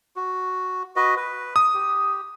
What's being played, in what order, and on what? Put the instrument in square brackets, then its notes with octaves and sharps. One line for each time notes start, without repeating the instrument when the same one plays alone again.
[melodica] F#4
F#4 B4 D#5
B4
[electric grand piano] D#6
[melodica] G4